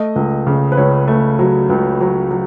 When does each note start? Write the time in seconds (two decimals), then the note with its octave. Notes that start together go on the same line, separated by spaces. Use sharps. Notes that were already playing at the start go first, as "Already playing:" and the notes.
Already playing: A3 D#5
0.16 C#2
0.47 C#3
0.72 B4
0.77 C#2 C#5
1.08 A3
1.39 F#3
1.70 C#2
2.01 F#3
2.31 F#3